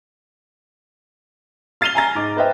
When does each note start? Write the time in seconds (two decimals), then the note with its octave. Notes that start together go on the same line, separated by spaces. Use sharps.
1.81 F6 A6 C7 D#7 F7 G7
1.95 G#5 A#5 A6 A#6
2.15 G#2 D6
2.36 B4 C5 D#5 E5 G5